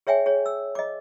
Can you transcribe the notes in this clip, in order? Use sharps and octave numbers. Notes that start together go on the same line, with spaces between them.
G#4 C#5 E5 G5 G#5
G#4 C#5
E6
D#5 D6